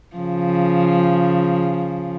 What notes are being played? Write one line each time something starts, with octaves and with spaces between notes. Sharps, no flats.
C#3 F3